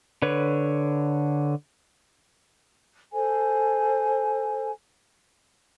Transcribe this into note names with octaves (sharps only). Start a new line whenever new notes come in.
D3 B4 C#5
A4 C5 G#5